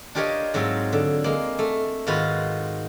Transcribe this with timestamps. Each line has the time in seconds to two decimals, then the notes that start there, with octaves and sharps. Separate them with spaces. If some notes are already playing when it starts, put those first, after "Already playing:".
0.15 D4 F4 G4 A#4 C#5 D#5
0.54 G#2 F#3 C4 F4 E5
0.93 D3
1.24 G#3 A#3
1.59 A3
2.07 G#2 D#3 F4 F#4 B4